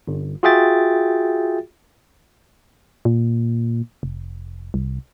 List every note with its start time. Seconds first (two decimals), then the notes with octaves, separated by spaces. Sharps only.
0.07 G1
0.43 F4 F#4 G#4 E5 G5 A6
3.05 A#2
4.03 F1
4.74 C2